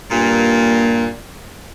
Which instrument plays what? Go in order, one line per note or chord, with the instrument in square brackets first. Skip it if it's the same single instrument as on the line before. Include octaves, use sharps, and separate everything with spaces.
[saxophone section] G2 A#2 [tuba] A#3